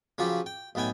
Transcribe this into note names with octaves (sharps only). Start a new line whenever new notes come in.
C#3 F3 F#3 F4 G4
G5
B1 A2 B3 G5 G#5